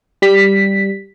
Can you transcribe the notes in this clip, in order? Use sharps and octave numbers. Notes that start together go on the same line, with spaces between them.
G3 B6